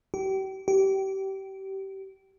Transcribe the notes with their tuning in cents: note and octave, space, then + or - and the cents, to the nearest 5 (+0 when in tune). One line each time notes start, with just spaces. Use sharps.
G4 -35
G4 -25